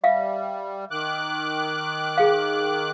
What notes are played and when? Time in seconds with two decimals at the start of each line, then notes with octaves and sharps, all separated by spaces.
0.04 G3 E5 F5
0.91 D#3 D6 F#6
2.18 G#4 F5